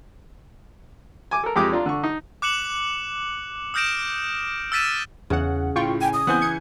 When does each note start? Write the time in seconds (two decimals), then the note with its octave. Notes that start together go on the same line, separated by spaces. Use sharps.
1.31 G#5 D6
1.44 A4 A#4
1.56 F2 G#3 G4 D6 D#6
1.72 D4 F4 A#5
1.86 D3 C#6
2.03 D#4
2.42 D6 F#6 C#7 E7 F#7
3.74 D#6 F6 G6 A#6 D7 E7
4.72 E6 F6 A6 B6 D#7 E7
5.30 E2 C#3 F#5
5.76 A2 F4 G5 C#6
6.01 G5 G#5
6.13 D#6
6.27 E3 B3 C4 F#5 G#5 G6
6.41 G#6 C#7